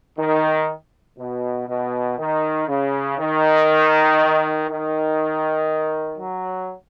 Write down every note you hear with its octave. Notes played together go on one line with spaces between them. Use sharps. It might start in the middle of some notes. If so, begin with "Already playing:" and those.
D#3
B2
B2
D#3
C#3
D#3
D#3
F#3